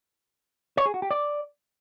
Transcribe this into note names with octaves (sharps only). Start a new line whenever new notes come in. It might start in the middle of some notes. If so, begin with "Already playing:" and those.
C#5
G#4
F#4
G4
D5